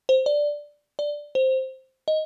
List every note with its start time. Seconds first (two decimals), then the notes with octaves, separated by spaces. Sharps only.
0.09 C5
0.26 D5
0.99 D5
1.35 C5
2.08 D#5